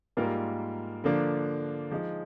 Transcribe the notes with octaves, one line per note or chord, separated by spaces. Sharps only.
G#2 G3 A#3 F4 A#4
D3 F3 A#3 D4
F3 G#3 D#4